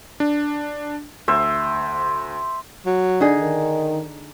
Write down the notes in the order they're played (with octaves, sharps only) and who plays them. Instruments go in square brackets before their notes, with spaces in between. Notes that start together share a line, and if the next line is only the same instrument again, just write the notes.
[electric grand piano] D4
[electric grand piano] D2 [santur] C5 E5
[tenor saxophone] F#3
[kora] D3 D#4 G#4
[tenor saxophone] D#3